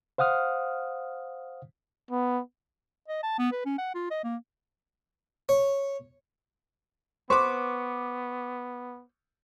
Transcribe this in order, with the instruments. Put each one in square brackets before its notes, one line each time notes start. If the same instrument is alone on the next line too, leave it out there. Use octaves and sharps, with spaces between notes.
[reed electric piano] C5 F5 F#5 D#6 F6
[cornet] B3
[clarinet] D#5
A5
B3
B4
C#4
F#5
F4
D#5
A#3
[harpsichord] C#5
[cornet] B3 [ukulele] B4 C5 [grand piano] C#6 D6